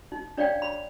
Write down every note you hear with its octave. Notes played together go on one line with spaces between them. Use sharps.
D#4
D4 C#5 D5 F5 G5
B5